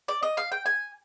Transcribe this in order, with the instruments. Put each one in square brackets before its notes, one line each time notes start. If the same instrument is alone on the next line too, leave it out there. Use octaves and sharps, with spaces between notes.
[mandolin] D5
D#5
F5
G5
G#5